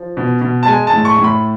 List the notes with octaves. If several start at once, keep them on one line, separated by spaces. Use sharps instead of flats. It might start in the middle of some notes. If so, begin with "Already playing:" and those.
Already playing: F3
B2
B2
A5
G#3 G#5
A5
A2
C#6
A2
B5